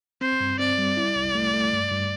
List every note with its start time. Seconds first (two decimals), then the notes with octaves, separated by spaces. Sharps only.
0.21 C4 C5
0.40 G2
0.59 C4 D5
0.78 G3
0.97 E4
1.16 C2
1.35 A3
1.53 A3
1.73 G2
1.91 G2